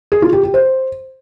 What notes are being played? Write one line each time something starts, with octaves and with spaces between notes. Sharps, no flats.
G#4
F4
G4
G4
C5